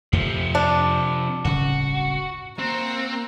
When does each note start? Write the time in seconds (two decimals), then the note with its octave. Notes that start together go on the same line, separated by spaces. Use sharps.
0.13 F2 C3 F3 A3
0.55 D4
1.45 D1 G1 C#3 F#4
2.59 A#3 C4 F#4 A#5